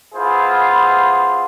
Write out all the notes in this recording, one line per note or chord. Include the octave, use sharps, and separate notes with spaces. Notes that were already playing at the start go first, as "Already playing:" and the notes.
B3 E4 F4 G#4 C5